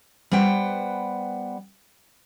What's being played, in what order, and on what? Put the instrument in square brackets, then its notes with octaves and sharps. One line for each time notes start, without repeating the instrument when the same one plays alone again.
[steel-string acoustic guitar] G3 B3 B4 C5 F#5 G5